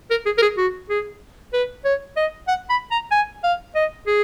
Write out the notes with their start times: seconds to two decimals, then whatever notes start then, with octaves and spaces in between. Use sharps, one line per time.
0.11 A#4
0.26 G#4
0.38 A#4
0.42 G#4
0.57 F#4
0.90 G#4
1.53 B4
1.85 C#5
2.17 D#5
2.48 F#5
2.70 B5
2.91 A#5
3.12 G#5
3.44 F5
3.75 D#5
4.07 G#4